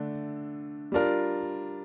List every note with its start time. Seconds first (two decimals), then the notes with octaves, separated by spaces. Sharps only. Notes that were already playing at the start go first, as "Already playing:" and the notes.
Already playing: D3 A3 D4
0.92 G3 D4 F4 A#4